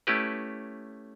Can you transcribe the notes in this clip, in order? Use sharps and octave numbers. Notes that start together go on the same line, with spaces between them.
A3 C#4 E4 G4 B4